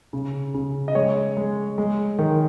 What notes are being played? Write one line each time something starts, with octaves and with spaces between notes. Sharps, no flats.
C#3
C#3
D#5
G#3 C#5
G#3
G#3
D#3